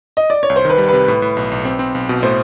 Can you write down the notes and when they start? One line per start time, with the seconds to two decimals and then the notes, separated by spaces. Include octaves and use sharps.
0.17 D#5
0.30 D5
0.43 C#5
0.50 C2
0.56 C5
0.65 D#3 B4
0.78 G3
0.88 C3 B4
1.08 A2
1.22 A2
1.37 B1
1.52 B1
1.65 C4
1.79 C4
1.95 B1
2.09 B2
2.23 A2 C5